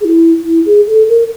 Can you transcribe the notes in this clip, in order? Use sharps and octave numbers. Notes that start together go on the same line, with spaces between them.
G#4
E4
E4
G#4
A4
A#4